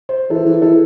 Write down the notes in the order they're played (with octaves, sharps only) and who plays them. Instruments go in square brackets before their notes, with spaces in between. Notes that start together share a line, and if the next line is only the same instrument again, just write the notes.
[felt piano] C5
[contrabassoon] E3 [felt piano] A4
[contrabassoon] E3
[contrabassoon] E3 [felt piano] A4